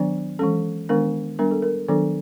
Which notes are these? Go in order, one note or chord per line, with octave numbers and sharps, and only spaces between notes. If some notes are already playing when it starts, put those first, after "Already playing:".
Already playing: D#3 F#3 B3 D4
E3 G#3 C#4 A4
D#3 G#3 B3 D4 A#4
G3 B3 D4 A#4
A4
A#4
D#3 F#3 B3 D4 A4